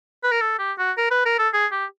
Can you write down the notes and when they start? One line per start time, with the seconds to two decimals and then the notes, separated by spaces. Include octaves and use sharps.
0.24 B4
0.32 A#4
0.41 A4
0.59 G4
0.79 F#4
0.98 A#4
1.11 B4
1.26 A#4
1.39 A4
1.54 G#4
1.72 G4